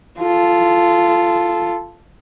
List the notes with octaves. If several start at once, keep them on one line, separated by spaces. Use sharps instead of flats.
F4 A4